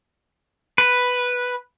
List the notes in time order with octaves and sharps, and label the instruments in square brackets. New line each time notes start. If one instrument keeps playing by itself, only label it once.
[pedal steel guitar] B4